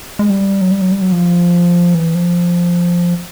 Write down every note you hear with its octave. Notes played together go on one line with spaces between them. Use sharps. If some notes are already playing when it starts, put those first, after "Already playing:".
G#3
G3
F#3
G3
F#3
G3
F#3
F3
E3
F3